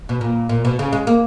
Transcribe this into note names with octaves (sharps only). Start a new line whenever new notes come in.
B2
A#2
A#2
B2
C#3
G#3
A#3